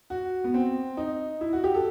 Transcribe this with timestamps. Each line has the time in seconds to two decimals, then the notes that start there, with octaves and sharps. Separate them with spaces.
0.10 F#4
0.44 B3
0.54 C4
0.97 D#4
1.41 E4
1.53 F#4
1.64 G4
1.75 A4